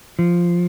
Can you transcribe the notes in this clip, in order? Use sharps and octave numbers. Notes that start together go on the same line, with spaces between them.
F3